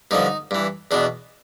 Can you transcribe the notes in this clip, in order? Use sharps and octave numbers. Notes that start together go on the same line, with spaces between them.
G2 D3 F3 D#4
G2 E3
E2 B2 D4